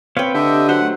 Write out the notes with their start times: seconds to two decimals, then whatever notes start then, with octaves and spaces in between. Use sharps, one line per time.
0.17 C4 B4 C#5 F5 G5
0.35 D3 G4 D#5 E5
0.68 F#3 C5 F#5
0.81 A3